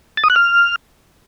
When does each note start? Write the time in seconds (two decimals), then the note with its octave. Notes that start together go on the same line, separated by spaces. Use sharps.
0.17 A6
0.24 D#6
0.30 F#6
0.36 F6